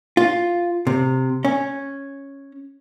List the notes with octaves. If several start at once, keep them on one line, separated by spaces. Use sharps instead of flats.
F4
C3
C#4